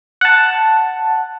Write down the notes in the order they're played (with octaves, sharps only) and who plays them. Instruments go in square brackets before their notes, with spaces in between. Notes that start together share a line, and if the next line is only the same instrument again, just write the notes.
[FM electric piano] F#5 A5